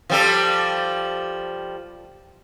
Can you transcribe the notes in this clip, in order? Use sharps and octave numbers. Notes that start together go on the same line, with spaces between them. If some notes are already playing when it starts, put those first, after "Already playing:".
F3 G3 A4